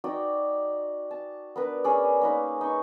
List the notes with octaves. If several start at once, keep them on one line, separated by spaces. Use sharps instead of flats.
D#4 F#4 D5 G5
A5
B3 D4 A#4 B4
C#4 G#4 D5
A#3 D#4 B4
D#4 C#6